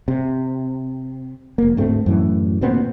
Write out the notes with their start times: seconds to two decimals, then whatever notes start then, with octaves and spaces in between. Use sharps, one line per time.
0.08 C3
1.58 F1 A#3
1.77 D2 G#2 A3 C4
2.06 F#2 A2 E3
2.61 D2 A#2 B3 C4